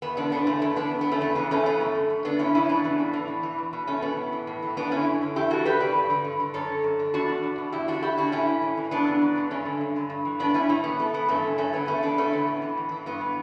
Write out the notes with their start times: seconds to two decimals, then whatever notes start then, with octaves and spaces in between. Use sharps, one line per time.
0.02 E2 B3
0.17 D3 B3 D4
0.32 E2 B3 D4
0.47 D3 A3 C#4
0.61 E2 B3 D4
0.76 D3 B3 D4
0.92 E2
1.01 B3
1.06 D3
1.11 A3 C#4
1.21 E2 B3
1.35 C#3 E3 B3
1.51 E2 A3 C#4
1.66 C#3 E3 B3
1.80 F#2 A3
1.95 D3
2.10 F#2
2.25 D3 B3 D4
2.39 F#2 C#4 E4
2.54 C#3 E3 C#4 E4
2.69 F#2 B3 D4
2.84 C#3 E3
2.99 A2
3.13 E3
3.28 A2
3.43 E3
3.58 E2
3.73 B2
3.87 E2 A3 C#4
4.02 B2 B3
4.17 A2
4.32 E3
4.47 A2
4.62 E3
4.77 F#2 B3 D4
4.91 D3 C#4 E4
5.06 F#2
5.22 D3
5.36 E2 E4 G4
5.50 C#3 E3 F#4 A4
5.65 E2 G4 B4
5.80 C#3 E3 B4 D5
5.95 G2
6.10 D3
6.24 G2
6.40 D3
6.54 F#2 A4 C#5
6.70 D3
6.84 F#2
6.99 D3
7.14 E2 D4 F#4
7.29 B2
7.44 E2
7.58 B2
7.72 E2 E4 G4
7.88 D3 D4 F#4
8.03 E2 E4 G4
8.17 D3 D4 F#4
8.32 A2 C#4 E4
8.47 E3
8.62 A2
8.77 E3
8.91 F#2 B3 D4
9.06 C#3 E3
9.22 F#2
9.36 C#3 E3
9.51 G2 A3 C#4
9.65 D3
9.81 G2
9.96 D3
10.10 G2
10.25 E3
10.39 G2 B3 D4
10.54 E3 C#4 E4
10.69 A2 A3
10.84 E3 B3
10.99 A2 A3
11.14 E3 B3
11.28 G2 A3 C#4
11.44 D3
11.58 G2 A3 C#4
11.73 D3 B3
11.87 E2 A3 C#4
12.03 D3 B3 D4
12.17 E2 A3 C#4
12.33 D3 B3
12.47 A2
12.62 E3
12.77 A2
12.92 E3
13.06 G2 B3
13.21 E3